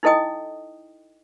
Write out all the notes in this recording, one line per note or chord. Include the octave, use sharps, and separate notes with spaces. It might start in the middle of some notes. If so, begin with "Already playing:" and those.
D#4 E4 A4 D#5 G5 D#6